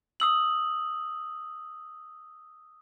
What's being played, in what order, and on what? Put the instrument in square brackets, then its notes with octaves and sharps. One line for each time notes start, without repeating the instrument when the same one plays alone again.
[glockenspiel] D#6 E6 F#7